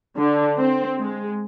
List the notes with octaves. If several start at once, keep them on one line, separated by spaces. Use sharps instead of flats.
D3
C4
G#3